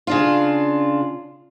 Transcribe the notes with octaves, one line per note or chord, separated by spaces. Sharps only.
C#3 D4 F4